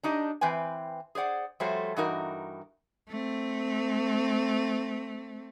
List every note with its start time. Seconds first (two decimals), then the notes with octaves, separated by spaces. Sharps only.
0.03 D4 D#4 G4 D#5
0.41 E3 C4 B4 G5 G#5
1.15 G#4 C5 D5 F#5
1.60 F3 G3 A3 F#4 C5 C#5
1.96 G2 E3 D#4 F#4 A#4
3.09 A3 C4